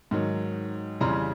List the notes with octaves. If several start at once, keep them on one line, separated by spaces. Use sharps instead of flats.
G#2 D#3 F#3
F2 C#3 E3 G3 A#5 C6